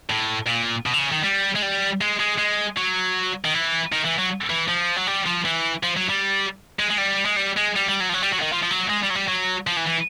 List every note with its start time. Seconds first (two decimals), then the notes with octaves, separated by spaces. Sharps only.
0.10 A2
0.47 A#2
0.86 B2
0.94 D3
0.99 C#3
1.12 D#3
1.23 G3
1.56 G#3
1.62 G3
2.01 G#3
2.20 G#3
2.38 G#3
2.78 F#3
3.45 D#3
3.54 E3
3.92 D#3
4.05 E3
4.18 F#3
4.50 E3
4.68 F3
4.96 F#3
5.07 G3
5.26 F3
5.45 E3
5.83 F3
5.97 F#3
6.09 G3
6.80 G#3
6.90 G#3
6.98 G3
7.26 G#3
7.37 G3
7.57 G#3
7.76 G3
7.89 G3
8.00 F#3
8.09 F3
8.14 F#3
8.23 G3
8.33 F#3
8.39 D3
8.42 D#3
8.53 F3
8.63 F3
8.71 F#3
8.90 G#3
9.03 G3
9.10 F#3
9.15 G3
9.28 F#3
9.67 F3
9.77 E3
9.87 E3